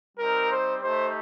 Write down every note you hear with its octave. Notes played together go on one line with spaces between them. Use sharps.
G3 C4 D#4 A#4
C5
A3 D#4 G4 C5